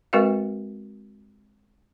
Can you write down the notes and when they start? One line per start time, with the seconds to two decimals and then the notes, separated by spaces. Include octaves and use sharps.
0.13 G#3 C4 F#4 A#4 B4 F5